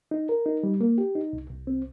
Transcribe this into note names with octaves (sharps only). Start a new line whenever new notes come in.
D#4
A#4
D#4
G3
A#3
G4
D#4
C2
C2
C4